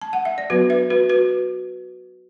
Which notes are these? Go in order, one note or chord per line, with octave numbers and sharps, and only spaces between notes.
A5
F#5
E5
D5
F#3 B3 D4 F#4 B4
B4 E5
F#4 B4
F#4 B4